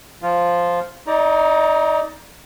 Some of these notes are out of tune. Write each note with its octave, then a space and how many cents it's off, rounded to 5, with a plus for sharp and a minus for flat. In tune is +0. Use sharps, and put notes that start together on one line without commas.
F3 +0 F4 +0
D#4 +30 D5 +0 A#5 +0